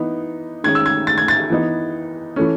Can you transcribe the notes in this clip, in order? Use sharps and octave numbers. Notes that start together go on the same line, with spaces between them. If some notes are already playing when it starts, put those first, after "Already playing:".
Already playing: E3 B3 D#4
D#3 G#3 C#4 G#6
E6
G#6
A6
G#6
A6
E3 B3 D#4
E3 A3 C#4